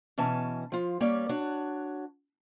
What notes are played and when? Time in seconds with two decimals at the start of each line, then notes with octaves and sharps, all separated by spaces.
0.18 B2 E3 C#4 G#5 A5
0.72 F3 F4
1.00 G3 A#3 C#4 C#5 D5
1.29 D4 F#4 C#5